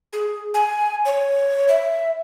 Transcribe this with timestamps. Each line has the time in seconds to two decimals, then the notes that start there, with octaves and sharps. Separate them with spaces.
0.13 G#4
0.54 G#5
1.05 C#5
1.68 E5